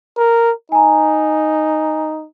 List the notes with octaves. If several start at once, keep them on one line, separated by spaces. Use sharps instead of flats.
A#4
D#4 G#5 A#5